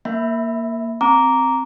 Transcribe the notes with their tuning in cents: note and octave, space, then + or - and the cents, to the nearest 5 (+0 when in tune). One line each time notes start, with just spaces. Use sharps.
A#3 +0 E5 +0 B5 +0
C4 +0 A#5 +0 D6 -15